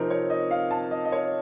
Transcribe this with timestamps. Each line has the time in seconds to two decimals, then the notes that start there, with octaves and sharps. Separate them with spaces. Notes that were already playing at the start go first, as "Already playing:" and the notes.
Already playing: C3 F3 C4 D#4 A#4
0.10 C#5
0.30 D#5
0.51 F5
0.71 A5
0.91 D#5
1.05 D#5
1.12 C#5